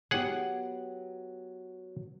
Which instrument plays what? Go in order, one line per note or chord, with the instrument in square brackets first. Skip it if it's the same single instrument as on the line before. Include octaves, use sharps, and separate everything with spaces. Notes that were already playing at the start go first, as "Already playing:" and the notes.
[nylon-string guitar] F#3 B3 G4 [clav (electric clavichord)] G#4 F#5